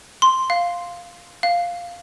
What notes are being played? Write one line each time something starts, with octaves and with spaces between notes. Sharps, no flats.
C6
F5
F5